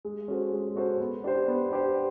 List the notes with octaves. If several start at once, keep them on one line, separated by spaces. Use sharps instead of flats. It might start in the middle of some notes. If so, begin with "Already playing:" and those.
G#3
C#4 F#4 A4 C5
G#3
C#4 F#4 A4 C5
B3
D4 G4 C5
B3
D4 G4 C5